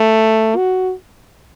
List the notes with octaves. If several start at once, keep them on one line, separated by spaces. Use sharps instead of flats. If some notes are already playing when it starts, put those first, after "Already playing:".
Already playing: A3
F#4